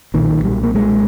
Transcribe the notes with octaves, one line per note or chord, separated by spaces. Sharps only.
B1 A#2 D#3
G3
A#3
G#3